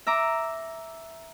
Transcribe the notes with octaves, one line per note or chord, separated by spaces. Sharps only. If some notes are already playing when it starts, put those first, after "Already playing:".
E5 A#5 D6